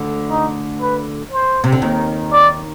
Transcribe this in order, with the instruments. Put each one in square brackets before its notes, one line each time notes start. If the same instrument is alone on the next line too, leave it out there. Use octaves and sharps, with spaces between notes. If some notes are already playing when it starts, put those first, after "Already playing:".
Already playing: [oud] D2 D3
[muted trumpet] D#4
B4
C5
[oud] C3
D3
D#2 D#3
[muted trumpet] D5